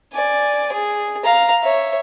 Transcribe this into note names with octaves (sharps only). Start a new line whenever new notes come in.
D5 G#5
G#4
F5 A#5
C#5 E5